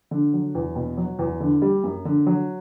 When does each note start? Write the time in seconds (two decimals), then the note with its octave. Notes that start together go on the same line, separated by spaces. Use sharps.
0.11 D3
0.33 F#3
0.55 E2
0.76 B2
0.97 F#3
1.19 E2
1.40 D3
1.62 G3
1.84 F#2
2.05 D3
2.26 F#3